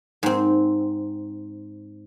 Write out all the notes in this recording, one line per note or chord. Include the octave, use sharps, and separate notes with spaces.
G#2 C4